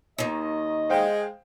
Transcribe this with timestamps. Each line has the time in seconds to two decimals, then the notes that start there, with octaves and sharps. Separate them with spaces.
0.18 D#2 D#3 D#5
0.90 G#3 C5 F5 G5